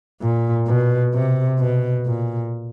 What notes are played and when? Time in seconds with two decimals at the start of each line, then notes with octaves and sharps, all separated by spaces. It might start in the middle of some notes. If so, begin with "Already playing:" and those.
0.21 A#2
0.67 B2
1.14 C3
1.59 B2
2.06 A#2